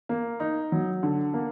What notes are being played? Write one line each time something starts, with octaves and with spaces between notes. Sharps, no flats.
A#3
D#4
F#3
D3
A#3